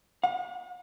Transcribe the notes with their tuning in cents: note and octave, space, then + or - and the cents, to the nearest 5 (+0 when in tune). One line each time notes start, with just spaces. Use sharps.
F#5 -45